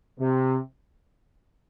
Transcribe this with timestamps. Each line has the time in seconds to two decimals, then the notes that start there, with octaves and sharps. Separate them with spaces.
0.19 C3